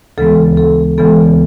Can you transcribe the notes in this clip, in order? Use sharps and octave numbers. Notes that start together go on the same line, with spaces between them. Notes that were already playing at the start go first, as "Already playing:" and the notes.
D2 C#3 E3 G#3 B3 A4
A4
D2 C#3 E3 G#3 B3 A4